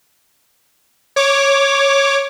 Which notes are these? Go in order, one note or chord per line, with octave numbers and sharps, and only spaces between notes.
C#5 D6